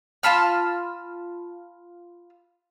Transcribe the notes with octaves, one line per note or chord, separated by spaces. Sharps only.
F4 A5 B5 F6